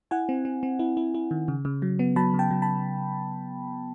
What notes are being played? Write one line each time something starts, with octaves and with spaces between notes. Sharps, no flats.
E4 F#5 G#5
C4
C4
C4
E4
E4
E4
D#3
C#3
C#3
F#3
B3
F#3 A5 B5
C#3
G5 A5
F#3
A5 B5